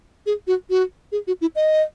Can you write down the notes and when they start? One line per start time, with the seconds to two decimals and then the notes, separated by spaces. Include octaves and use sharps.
0.26 G#4
0.47 F#4
0.70 F#4
1.12 G#4
1.27 F#4
1.41 E4
1.56 D#5